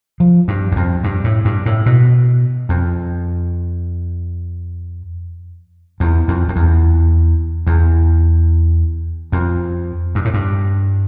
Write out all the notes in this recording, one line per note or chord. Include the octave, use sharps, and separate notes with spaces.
F3
G2
E2
F2
G2
A2
G2
A2
B2
F2
E2
F2
F2
E2
E2
F2
G2
A2
G2